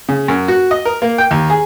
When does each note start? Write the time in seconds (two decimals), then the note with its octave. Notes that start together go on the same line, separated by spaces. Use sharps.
0.09 C#3
0.28 F#2
0.48 F#4
0.71 D#5
0.85 A#4
1.02 A#3
1.18 G5
1.31 D#2
1.50 G#4